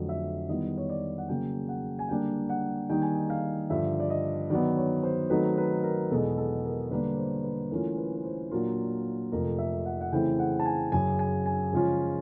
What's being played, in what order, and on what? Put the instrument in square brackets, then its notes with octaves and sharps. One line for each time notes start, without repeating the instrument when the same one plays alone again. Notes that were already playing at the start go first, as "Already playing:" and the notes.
Already playing: [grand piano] F2 D3 F#3 A3
E5
D#3 G3 B3 E4 D#5
C#5
D5
F#5
C#3 F#3 A#3 C#4 G5
F#5
G#5
D3 G3 A#3 D4 G5
F#5
D#3 G3 A#3 D#4 G5
G#5
G5
F5
G2 D3 F3 E5
D5
D#5
D#3 F#3 B3 D5
C#5
C5
D#3 F#3 A3 C4 D#4 B4
B4
A#4
E2 B2 G#3 B3 A4
A4
A#4
D3 G3 A#3 D4 B4
C5
B4
E3 A3 C#4 F4 A#4
B4
B4
C5
A#2 F#3 A#3 D4 F4 A#4
F2 C3 F3 A3 A#4
E5
F#5
F#5
C#3 E3 A3 C4 E4 G5
F#5
A5
G#5
F#2 C#3 F#3 G#5
G#5
G#5
C#3 F3 G#3 C#4 F4